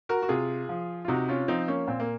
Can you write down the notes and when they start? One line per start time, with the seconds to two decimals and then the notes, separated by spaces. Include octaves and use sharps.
0.09 F#4 A#4
0.22 F#4
0.29 C3 F4 G#4
0.69 F3
1.05 F4
1.08 C3 D#4 F#4
1.29 C#4 F4
1.48 F3 C4 D#4
1.68 A#3 C#4
1.87 A#2 C4
2.00 A#3